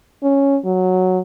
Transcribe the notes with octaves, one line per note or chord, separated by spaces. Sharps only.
C#4
F#3